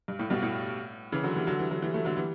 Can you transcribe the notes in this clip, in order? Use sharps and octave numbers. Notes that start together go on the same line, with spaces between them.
G2
A2
G2 B2
A2
C#3 E3
D3 F#3
E3 G3
D3 F#3
E3 G3
D3 F#3
E3 G3
F#3 A3
D3 F#3
E3 G3